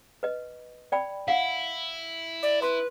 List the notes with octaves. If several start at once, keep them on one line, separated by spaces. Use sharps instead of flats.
B4 D#5
D5 G5 B5
E4 F5 F#5
D5
B4 C6